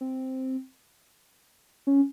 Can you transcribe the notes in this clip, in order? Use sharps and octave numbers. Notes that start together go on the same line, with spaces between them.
C4
C#4